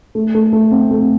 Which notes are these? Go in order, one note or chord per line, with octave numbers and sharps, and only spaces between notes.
A3
A3
A3
C4
A3